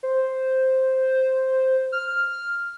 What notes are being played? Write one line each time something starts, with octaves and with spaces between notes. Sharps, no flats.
C5
F6